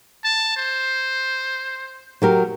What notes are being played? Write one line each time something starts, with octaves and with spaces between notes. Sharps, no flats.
A5
C5
F#3 G4 A#4